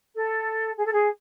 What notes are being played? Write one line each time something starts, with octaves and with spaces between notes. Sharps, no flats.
A4
G#4
A4
G#4